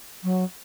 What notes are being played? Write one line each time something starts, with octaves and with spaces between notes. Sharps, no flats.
F#3